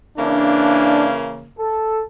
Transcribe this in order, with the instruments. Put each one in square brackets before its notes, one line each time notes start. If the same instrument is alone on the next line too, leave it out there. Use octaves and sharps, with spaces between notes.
[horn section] C#3 E3 A#3 [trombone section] D4
[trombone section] A4